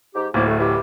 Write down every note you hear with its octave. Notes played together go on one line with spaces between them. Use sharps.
G#2 G4
D1 A2 F3 A#3
A3
E3 G4